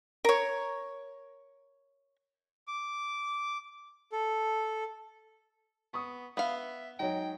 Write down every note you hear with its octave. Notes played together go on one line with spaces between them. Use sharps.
A#4 C#5
D6
A4
B3 C#6 D#6
B3 E5 F5
F#3 G#3 D#4 G5